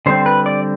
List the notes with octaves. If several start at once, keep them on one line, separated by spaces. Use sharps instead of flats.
D3 G3 C4 C5
B4
D5